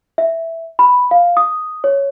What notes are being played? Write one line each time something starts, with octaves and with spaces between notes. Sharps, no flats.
E5
B5
F5
D#6
C#5